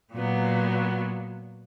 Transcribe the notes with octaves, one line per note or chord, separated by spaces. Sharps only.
A#2 F#3 B3